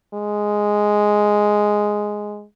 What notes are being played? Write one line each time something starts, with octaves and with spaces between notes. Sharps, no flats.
G#3